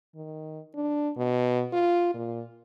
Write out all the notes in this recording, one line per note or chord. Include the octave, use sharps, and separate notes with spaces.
D#3
D4
B2
F4
A#2